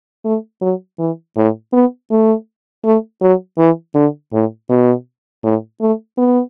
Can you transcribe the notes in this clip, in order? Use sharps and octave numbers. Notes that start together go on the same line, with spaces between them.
A3
F#3
E3
A2
B3
A3
A3
F#3
E3
D3
A2
B2
A2
A3
B3